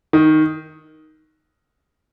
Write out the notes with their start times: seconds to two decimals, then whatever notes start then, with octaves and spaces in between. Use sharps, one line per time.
0.13 D#3